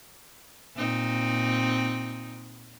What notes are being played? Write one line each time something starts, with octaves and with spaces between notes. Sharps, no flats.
A#2 C4 D#4